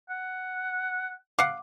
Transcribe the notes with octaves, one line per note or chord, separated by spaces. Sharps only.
F#5
F5 F#5 D6